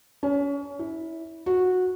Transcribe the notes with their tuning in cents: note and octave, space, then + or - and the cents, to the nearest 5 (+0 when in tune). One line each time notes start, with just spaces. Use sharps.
C#4 +30
E4 -15
F#4 -15